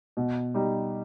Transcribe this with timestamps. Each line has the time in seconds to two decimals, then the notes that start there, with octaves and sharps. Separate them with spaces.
0.17 B2
0.54 G3 D#4